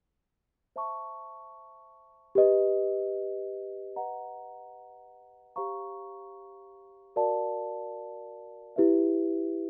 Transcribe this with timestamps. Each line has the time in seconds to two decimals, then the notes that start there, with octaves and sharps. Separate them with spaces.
0.76 C5 E5 A5 C#6
2.35 G4 B4 D#5
3.96 B4 D#5 F#5 A#5
5.56 G4 C5 F5 A#5 C#6
7.16 F#4 A#4 D5 F5 A5
8.76 E4 G4 B4 E5